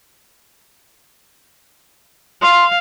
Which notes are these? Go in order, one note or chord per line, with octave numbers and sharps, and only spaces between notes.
F5 C6